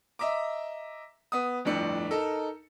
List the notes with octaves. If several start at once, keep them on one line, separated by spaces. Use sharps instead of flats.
D#5 E5 A#5 D6
B3 D#6
G1 F2 A2 D4 C#7
D#4 A4 A#4 E6